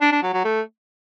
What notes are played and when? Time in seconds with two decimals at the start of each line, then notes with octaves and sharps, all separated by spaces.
0.01 D4
0.12 D4
0.23 F#3
0.34 F#3
0.44 A3